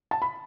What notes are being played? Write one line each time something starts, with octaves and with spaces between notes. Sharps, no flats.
A5
B5